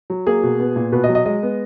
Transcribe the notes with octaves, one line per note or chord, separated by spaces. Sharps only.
F#3
A#3 G#4
B2
B3
A#2
B2 B4
D#5
F#3
D#5
G#3 D#5
B3